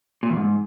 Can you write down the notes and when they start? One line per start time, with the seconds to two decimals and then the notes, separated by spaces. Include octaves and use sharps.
0.23 A#2
0.30 E2
0.37 G#2